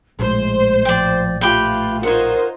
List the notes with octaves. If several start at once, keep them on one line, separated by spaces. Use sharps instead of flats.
A#1 A2 G#3 C5
F3 D5 G5
A3 F4 G4 B4 G5
D#4 F4 A#4 C5 C#5 F#5